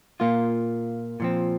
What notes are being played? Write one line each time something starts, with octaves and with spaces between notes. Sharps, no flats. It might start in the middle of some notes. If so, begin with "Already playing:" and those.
A#2 A#3 F4
A#2 F3 C4